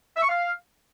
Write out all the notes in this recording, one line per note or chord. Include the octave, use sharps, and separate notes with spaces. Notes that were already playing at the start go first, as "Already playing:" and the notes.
E5
C#6
F5